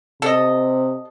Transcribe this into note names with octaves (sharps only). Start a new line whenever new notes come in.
C3 A4 D#5